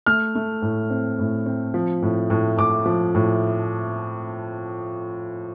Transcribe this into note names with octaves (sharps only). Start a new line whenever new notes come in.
A3 F6
A3
A2
C4
A2
C4
F3
A2
A2
A2 D6
F3
A2